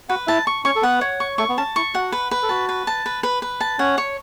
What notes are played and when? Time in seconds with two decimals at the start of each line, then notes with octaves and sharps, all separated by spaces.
0.09 F#4 B4 F#5
0.27 E4 E5 A5
0.47 C#6
0.65 C#4 C#5 C#6
0.76 A4
0.83 B3 B4 F#5
1.01 C#5
1.20 C#6
1.38 A3 A4 C#6
1.49 B3
1.57 C#4 A5
1.76 E4 C#6
1.95 F#4 F#5
2.12 B4
2.31 B4
2.43 A4
2.49 F#4 A5
2.69 B4
2.87 A5
3.06 B4
3.23 B4
3.42 B4
3.61 A5
3.79 C#4 C#5 F#5
3.98 C#5